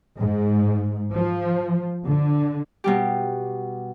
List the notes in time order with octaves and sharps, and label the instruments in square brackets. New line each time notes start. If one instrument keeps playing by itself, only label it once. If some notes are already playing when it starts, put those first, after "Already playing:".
[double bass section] G#2
F3
D3
[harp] B2 G3 G4